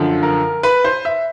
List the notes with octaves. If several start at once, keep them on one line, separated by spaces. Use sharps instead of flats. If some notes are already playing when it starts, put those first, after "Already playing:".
Already playing: F#2 D3 F3
A#4
B4
C5
E5